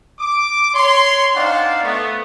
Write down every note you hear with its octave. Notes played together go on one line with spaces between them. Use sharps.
D6
C#5 C6
C4 D4 D#4 D5 F5 F#5
A3 B3